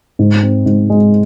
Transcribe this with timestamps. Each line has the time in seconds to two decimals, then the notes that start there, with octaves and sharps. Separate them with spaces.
0.19 G#2
0.43 C4
0.66 G#2
0.90 G#3